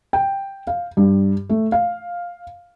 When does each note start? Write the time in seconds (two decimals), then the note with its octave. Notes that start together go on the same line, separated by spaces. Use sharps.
0.13 G5
0.67 F5
0.97 G2
1.50 A3
1.72 F5